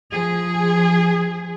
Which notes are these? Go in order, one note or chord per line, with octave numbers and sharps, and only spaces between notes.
F3 G#4